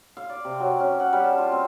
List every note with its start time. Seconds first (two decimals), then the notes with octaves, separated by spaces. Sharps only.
0.17 F5
0.30 D5
0.45 C3
0.60 F#3
0.80 C#4
1.00 F#5
1.13 G3
1.24 A5
1.38 F4
1.52 C4